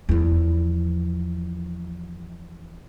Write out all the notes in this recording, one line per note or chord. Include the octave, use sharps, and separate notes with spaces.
E2 F3